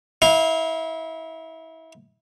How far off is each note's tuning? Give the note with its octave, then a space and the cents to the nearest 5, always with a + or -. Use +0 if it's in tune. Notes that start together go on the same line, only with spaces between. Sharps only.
E4 -30 F5 +0